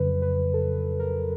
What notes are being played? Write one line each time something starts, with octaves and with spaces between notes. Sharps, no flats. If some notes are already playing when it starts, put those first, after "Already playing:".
Already playing: F2 C#3 F#3 B4
B4
A4
A#4